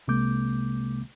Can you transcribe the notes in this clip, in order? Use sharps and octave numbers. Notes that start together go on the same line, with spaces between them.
C2 C3 G#3 A#3 D6 G6